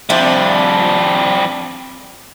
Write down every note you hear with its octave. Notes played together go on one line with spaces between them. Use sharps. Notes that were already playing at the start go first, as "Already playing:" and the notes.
F3 G3 C4 D4 E5